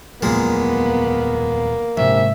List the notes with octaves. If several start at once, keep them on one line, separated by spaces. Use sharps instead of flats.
D#1 F2 A#2 D#3 F#3 G#3 A#3 B3
A#1 G#2 C3 D#3 E5